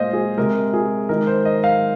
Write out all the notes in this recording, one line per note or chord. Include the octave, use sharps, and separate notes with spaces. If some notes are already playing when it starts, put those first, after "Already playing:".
Already playing: A#2 G#3 C5 D#5 F5
G#4
C3 G#3 A#4
G#4
D#3 G#3 A#4
C5
D#5
F5